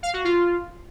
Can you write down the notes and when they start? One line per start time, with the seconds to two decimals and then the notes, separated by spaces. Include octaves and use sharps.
0.03 F5
0.14 F#4
0.24 F4